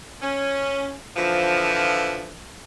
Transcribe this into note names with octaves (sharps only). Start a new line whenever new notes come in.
C#4
D3 E3 F3